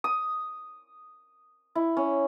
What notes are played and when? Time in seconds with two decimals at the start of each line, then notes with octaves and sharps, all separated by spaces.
0.04 D#6
1.75 E4
1.97 C#4